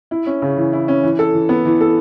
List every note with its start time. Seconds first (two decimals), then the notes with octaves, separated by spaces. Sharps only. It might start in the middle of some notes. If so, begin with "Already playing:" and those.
0.11 E4
0.27 C#4
0.42 C#3
0.57 E3
0.73 E4
0.88 C#4
1.03 E3
1.19 A4
1.33 E3
1.49 B3
1.65 E3
1.81 A4